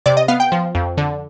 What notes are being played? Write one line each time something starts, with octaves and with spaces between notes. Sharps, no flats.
C3 D5
D#5
B3 F5
G5
F3
F2
D3